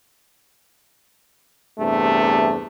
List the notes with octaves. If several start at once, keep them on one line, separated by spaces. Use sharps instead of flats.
E2 G2 C3 A3